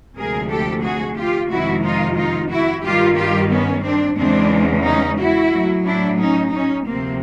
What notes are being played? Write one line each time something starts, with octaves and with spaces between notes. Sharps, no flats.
D2 C3 F3 G#3 G#4 A#4
G4 A4
F#4 G#4
F4 G4
F2 C3 D#3 G#3 E4 F#4
D#4 F4
D#4 F4
E4 F#4
G2 D#3 G3 F4 G4
F4 G4
B3 C#4
C4 D4
E2 C#3 E3 G#3 C4 D4
C#4 D#4
E4 F#4
A2 F#3
D4 E4
C#4 D#4
C#4 D#4
D2 C3 F3 A#3 C4